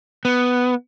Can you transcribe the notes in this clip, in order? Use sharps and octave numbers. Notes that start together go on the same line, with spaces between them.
B3